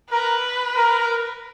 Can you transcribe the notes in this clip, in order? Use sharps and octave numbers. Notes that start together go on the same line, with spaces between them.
A#4 B4
A#4